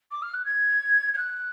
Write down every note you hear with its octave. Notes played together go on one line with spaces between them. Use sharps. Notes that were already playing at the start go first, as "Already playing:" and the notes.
D6
F6
F#6
G#6
G#6
F#6